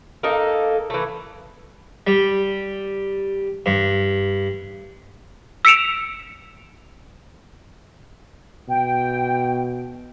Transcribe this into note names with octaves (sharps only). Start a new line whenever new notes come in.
A#3 D#4 A4
E3 A3
G3
G2
E6 B6 C#7 D7 E7 F7
B2 G5